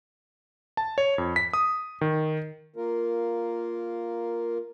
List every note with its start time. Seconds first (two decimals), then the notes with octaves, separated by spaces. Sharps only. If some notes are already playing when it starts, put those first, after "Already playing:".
0.77 A5
0.98 C#5
1.18 F2
1.36 B6
1.54 D#6
2.01 D#3
2.76 A#3 F4 A#4